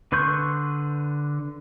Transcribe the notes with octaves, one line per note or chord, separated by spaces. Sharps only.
D3 B4 C6 C#6 G6